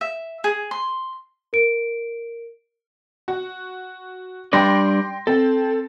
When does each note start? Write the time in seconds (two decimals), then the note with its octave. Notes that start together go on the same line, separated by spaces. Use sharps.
0.01 E5
0.44 G#4
0.71 C6
1.53 A#4 D7
3.28 F#4
4.53 G3 D4 D5 G5 C6 A#6
5.27 C4 A4